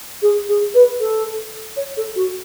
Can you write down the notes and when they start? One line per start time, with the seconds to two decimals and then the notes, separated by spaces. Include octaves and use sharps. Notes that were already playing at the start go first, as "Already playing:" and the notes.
0.22 G#4
0.48 G#4
0.74 B4
1.00 A4
1.76 C#5
1.97 A4
2.16 F#4